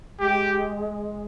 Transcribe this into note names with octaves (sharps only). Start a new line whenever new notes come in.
G#3 G4